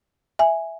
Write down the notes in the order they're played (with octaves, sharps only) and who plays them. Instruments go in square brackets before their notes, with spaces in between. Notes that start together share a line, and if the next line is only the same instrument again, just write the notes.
[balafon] E5 G#5